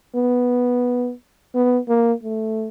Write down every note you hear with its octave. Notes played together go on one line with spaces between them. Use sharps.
B3
B3
A#3
A3